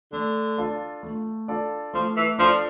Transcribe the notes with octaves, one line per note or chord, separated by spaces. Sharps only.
D3 A3
D4 F4 A4 D5
A3
D4 F4 A4 D5
F3 A3
E3
F3 D4 F4 A4 D5